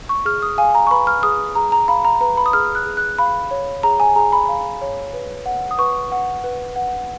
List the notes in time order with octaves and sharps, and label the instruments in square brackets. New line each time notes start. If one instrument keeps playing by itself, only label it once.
[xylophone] C#6
G#4 F6
D#6
F5 G#5
A#5
C#6
B4 B5
F6
G#4 D#6
G#4 A#5
A#5
F5 B5
A#5
B4 A#5
B5
D#6
G#4 F6
F#6
G#4
F#6
F5 B5
C#5
G#4 A#5
G#5
G#4 A#5
B5
F5
C#5
B4
F#5
D#6
B4 C#6
F#5
B4
F#5